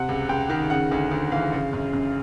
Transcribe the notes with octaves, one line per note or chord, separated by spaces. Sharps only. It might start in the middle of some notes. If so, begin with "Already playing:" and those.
Already playing: C3 F#5
C#2
C#2 G5
D#3
C#3 F#5
D2
D2
E3 F5
C#3
F#2
F#2